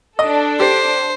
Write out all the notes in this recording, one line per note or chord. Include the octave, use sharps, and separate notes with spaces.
D4 A4 D#5
G4 C5